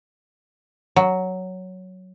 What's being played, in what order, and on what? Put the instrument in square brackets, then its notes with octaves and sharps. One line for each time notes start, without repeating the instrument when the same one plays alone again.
[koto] F#3